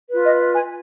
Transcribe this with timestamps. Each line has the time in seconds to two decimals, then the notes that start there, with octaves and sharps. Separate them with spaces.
0.09 F4 B4
0.25 D#5
0.55 G#5